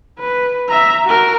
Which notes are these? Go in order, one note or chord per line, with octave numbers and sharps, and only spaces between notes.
B4
E5 A#5
F#4 A#4